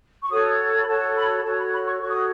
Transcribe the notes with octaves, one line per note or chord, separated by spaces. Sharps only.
C#6
F#4 A4 C#5 D#6
B5
F#4 A4 C#5 A5
B5
B5
F#4 A4 C#5 A5
B5
B5
C#6
F#4 A4 C#5 C#6
D#6